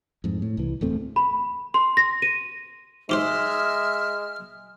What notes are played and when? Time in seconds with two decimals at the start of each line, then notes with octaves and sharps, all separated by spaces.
0.24 F2 G#2
0.42 A2
0.57 C2 E3
0.81 D1 E2 A3 C4
1.16 B5
1.74 C6
1.97 A#6
2.22 D#7
3.09 G#2 G#3 G4 C5 E5 F6